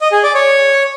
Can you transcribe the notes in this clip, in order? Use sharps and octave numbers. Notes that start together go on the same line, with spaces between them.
D#5
G#4
D5
C#5